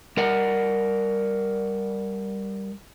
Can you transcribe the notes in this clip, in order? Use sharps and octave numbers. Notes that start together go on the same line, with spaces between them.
G3 A#4 D5 F#5